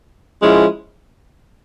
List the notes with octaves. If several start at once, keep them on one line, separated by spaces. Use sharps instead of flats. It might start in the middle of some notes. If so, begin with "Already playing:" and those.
F3 G#3 C#4 E4